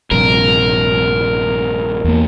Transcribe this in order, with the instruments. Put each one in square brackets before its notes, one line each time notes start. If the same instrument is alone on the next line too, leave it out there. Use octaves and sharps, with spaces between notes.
[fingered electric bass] A#1 G2 C3 [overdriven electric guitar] A#4
[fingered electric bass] E2 A#3